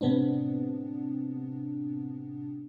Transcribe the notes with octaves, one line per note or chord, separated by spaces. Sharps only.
A2 C3 B3 C4 D4